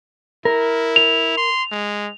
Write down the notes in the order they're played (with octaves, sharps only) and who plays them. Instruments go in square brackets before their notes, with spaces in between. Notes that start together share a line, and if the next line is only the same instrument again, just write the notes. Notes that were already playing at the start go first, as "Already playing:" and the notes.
[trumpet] E4 [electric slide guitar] A#4
[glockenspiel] F7
[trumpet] C6
G#3